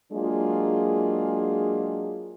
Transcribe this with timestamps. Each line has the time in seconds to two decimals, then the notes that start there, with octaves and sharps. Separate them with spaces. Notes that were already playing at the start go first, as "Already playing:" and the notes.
0.12 F#3 G#3 A#3 D4 F4 G#4